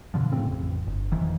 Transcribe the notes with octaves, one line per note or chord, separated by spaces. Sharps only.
B2 D3 F3
A2 C#3 C4
A1 F2
G1
F2 D#3 E3